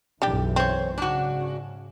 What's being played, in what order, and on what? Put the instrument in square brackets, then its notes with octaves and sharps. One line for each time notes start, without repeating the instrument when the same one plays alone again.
[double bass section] B1 F#2 E3 [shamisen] G3 D4 G4
[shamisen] C4 [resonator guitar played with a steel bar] C5 C#5
[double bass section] G#2 C#3 [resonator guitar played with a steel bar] D4 F#4